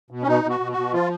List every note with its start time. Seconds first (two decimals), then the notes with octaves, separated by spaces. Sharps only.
0.11 B2
0.23 C#4
0.27 B2 D#4
0.44 B2
0.50 F#4
0.60 B2
0.72 F#4
0.77 B2
0.93 F3 F4